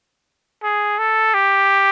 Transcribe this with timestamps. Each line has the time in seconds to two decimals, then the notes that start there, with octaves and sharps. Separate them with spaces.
0.63 G#4
0.99 A4
1.34 G4